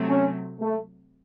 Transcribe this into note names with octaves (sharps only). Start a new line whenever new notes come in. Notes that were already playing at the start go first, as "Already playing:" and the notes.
Already playing: C3 F#3 A3
C#4
A3